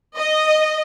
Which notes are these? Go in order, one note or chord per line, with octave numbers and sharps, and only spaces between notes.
D#5